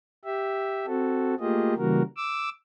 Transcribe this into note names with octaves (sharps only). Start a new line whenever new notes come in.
G4 E5
C4 F#4 A4
A3 A#3 F4 G4 G#4 D#5
C#3 E3 G3 A#3 F#4 A#4
D6 E6